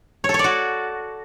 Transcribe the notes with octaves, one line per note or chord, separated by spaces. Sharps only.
C#5
A4
C#5
D5
F#4